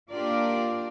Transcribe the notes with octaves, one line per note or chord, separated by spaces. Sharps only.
A#3 D4 F4 G4 A#4 D5